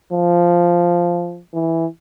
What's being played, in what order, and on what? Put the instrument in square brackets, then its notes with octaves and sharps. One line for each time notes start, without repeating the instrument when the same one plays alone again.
[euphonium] F3
E3